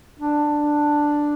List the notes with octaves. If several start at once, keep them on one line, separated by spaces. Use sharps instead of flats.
D4